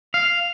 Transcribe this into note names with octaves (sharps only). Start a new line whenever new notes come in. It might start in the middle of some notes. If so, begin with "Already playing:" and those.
F5